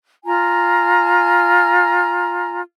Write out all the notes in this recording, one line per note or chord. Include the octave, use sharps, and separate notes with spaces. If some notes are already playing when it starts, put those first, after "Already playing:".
F4 G#5 A#5